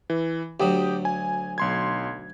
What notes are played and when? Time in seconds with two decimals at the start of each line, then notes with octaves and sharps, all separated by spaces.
0.10 E3
0.60 D2 F#3 G4 G5 D#6
1.05 G#5
1.58 B1 C6 G#6